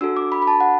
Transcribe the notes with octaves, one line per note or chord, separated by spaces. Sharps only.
D4 F#4 A4 E6
D6
B5
B5
A5
F#5